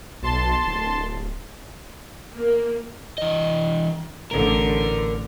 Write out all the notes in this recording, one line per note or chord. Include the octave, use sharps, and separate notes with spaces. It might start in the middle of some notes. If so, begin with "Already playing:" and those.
B1 A5 C6
D1
A#3
E3 D#5
A1 D3 A#4